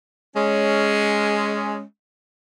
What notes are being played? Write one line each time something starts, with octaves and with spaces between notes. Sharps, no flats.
G#3 C#4